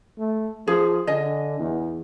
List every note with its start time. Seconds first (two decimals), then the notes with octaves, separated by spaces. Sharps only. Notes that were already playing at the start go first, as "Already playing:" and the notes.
0.18 A3
0.67 F3 G#4
1.07 D3 D#5 G#5
1.59 E2